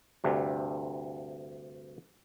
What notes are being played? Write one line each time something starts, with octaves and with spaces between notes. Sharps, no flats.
D2 G2 C3